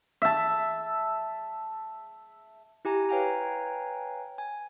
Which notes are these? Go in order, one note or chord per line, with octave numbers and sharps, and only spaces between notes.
E5 A5
E4 G4 G#5 A#5
B4 C#5 F5 G5 G#5 A#5
G#5